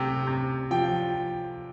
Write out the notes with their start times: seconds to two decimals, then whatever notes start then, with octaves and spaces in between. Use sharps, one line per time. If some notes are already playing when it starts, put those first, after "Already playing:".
Already playing: C3 A3 G5
0.27 C3
0.71 F3 G5